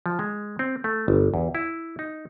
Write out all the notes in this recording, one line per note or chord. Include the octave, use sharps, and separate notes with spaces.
F3
G#3
C4
A3
G1
E2
E4
D#4